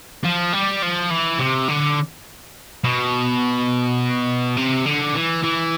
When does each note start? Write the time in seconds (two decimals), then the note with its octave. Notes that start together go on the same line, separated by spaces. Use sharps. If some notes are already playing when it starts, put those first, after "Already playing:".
0.24 F3
0.53 G3
0.82 F3
1.11 E3
1.39 C3
1.68 D3
2.84 B2
4.57 C3
4.86 D3
5.14 E3
5.43 E3